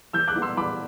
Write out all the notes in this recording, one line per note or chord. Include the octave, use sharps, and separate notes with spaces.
E3 E6 G6
D6 F#6
B3 E4
C6 E6
E3 B5 D6